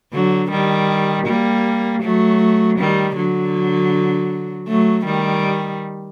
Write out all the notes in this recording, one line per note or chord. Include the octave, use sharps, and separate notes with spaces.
D3 F#3
D#3 G3
G3 A#3
F#3 A3
D#3 G3
D3 F#3
F#3 A3
D#3 G3